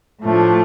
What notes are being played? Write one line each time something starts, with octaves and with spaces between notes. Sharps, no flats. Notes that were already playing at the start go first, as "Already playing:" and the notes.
A2 F3 A3 D4